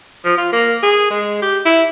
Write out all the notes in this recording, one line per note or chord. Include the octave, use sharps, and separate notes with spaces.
F3
F4
A#3
G#4
G#3
G4
E4